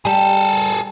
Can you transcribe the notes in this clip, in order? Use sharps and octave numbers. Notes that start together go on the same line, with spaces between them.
G3 G#4 A4